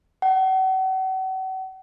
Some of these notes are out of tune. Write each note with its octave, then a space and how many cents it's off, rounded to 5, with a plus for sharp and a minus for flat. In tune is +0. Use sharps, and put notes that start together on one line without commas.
F#5 +40